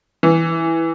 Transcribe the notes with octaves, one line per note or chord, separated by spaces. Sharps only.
E3